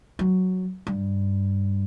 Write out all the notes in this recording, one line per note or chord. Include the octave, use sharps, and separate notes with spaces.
F#3
G2